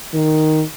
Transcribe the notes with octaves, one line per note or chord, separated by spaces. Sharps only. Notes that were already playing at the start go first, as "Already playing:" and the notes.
D#3